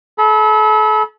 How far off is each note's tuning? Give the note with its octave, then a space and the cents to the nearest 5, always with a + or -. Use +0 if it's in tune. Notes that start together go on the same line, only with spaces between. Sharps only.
A4 -35 B5 -30